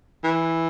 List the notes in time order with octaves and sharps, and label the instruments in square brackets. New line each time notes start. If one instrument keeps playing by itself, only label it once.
[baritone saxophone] E3